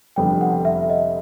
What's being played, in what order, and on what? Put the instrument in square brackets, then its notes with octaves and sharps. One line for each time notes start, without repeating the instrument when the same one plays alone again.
[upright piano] F1 F2 D3 G3 B3 [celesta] G5
[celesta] F#5
E5
D#5